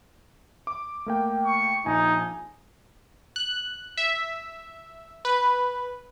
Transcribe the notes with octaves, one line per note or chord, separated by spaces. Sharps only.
D6
A3 A#3 G5
C#6
A#1 D#4 G#5
F#6
E5
B4